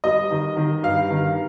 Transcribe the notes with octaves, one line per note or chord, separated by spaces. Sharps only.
G3 D#5
D#3
D#3
G2 F5
D#3